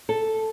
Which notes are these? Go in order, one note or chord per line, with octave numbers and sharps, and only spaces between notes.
A4